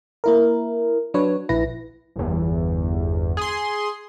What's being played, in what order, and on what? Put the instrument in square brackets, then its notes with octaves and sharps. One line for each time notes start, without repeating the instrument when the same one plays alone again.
[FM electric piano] A#3 E4 A#4
F#3 D4 B4 C#5
A#1 E4 B4 A#6
[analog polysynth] G1 E2
G#4 C6